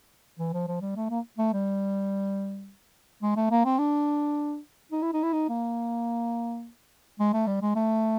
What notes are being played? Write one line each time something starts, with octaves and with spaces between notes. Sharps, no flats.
E3
F3
F3
G3
A3
A#3
A3
G3
G#3
A3
A#3
C4
D4
D#4
E4
D#4
E4
D#4
A#3
G#3
A3
G3
G#3
A3